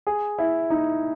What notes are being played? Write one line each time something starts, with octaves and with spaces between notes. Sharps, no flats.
G#4
E4
D#4